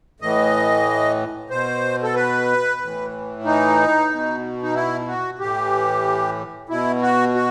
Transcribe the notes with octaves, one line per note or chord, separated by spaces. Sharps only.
A2 E3 D#5
B2 C5
A4
B4
A2 E3
D#4
B2
D#4
E4
F#4
A2 E3 G4
B2 E4
F#4
F#4